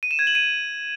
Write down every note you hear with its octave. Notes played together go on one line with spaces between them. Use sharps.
D#7
E7
G#6
F#7
D#7